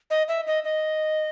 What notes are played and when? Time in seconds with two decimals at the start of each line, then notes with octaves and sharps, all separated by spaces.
0.10 D#5
0.28 E5
0.47 D#5
0.64 D#5